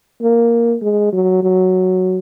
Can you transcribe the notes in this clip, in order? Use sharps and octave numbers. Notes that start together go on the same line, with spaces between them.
A#3
G#3
F#3
F#3